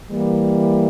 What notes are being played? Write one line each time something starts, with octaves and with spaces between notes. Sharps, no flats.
E3 G3 A#3